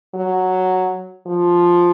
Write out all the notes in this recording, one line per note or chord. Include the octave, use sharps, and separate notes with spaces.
F#3
F3